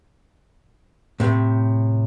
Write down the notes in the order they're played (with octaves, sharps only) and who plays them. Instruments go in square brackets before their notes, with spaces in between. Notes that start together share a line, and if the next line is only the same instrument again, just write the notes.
[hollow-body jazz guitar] A2 C3